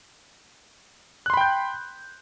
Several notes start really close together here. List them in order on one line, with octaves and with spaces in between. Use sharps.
F#6 C6 B5 G5 G6